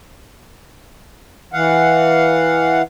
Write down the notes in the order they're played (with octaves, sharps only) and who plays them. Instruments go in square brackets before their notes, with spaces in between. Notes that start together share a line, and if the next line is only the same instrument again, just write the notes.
[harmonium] E3 F5 F#5